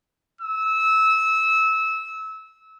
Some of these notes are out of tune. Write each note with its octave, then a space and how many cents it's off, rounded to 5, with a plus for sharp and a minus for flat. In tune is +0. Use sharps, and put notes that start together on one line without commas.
E6 -20